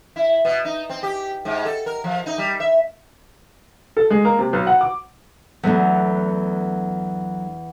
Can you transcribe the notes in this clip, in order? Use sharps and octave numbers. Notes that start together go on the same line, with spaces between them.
E4
B2
D#4
C4
G4
G#2
A4
A#4
F3
D#4
G3
E5
A4
G#3
A#3
C3
B1
F#5
D6
E2 F#3 A3 B3 D4